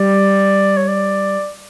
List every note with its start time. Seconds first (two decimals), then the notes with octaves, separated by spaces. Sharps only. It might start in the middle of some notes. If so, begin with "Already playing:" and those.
Already playing: G3 D5
0.77 C#5
0.88 D5